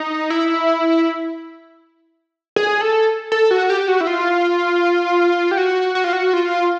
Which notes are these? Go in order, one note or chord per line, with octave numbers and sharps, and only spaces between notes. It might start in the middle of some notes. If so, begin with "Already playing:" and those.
Already playing: D#4
E4
G#4
A4
A4
F#4
G4
F#4
E4
F4
G4
F#4
F#4
F4
F#4
F4